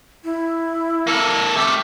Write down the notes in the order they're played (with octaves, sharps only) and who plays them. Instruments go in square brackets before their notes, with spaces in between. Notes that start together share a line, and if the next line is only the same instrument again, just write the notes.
[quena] E4
[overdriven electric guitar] A#3 A4
A3 G4